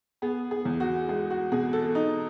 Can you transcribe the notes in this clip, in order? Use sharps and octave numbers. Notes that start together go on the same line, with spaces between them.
B3 G#4
G#4
E2
F#4
G#3 G#4
F#4
B2 G#4
A4
D#4